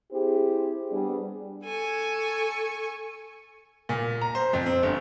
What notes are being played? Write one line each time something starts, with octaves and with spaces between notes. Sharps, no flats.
C4 E4 G4 G#4 C5
G3 B3 D4 G#4
A4 G#5 C#6
A#2
A#5
C5
F2
C4
G1